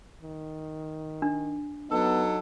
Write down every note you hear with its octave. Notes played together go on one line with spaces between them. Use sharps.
D#3
D4
F#3 B3 D#4 A4